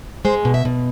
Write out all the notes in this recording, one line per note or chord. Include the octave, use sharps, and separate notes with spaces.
G#3 C5
B2
E5
B2